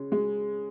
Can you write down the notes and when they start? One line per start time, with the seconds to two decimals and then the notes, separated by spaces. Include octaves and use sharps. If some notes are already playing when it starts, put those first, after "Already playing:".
Already playing: C#3 G#3
0.12 G#3